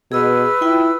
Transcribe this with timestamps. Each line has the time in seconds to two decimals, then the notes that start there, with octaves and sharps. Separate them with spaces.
0.12 B2 G#4 B4 D#5 E6 F6
0.62 E4 F4 G5